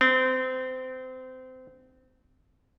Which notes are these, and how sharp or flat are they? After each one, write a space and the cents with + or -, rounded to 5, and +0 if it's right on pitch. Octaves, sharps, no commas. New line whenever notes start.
C4 -25